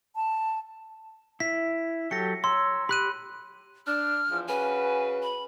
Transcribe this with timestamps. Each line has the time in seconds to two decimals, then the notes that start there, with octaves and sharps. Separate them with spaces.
0.16 A5
1.40 E4 B6
2.11 F#3 G4 A4 A#6 C#7
2.44 C#5 A#5 C6 E6
2.89 G4 B5 F#6 D#7
3.87 D4 F6
4.29 E2 F3
4.48 C#3 F#4 B4 G#5
5.23 B5